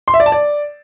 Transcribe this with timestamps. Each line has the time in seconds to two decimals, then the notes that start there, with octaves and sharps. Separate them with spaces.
0.08 C6
0.14 E5
0.20 D5
0.26 A5
0.32 D5